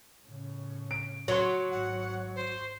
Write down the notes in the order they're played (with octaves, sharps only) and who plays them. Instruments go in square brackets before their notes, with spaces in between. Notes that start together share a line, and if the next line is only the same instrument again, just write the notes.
[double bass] A2 C#3
[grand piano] D7
[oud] F#3 [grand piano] C#5 C6
[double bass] G#1 G#2 [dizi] F#5
[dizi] C5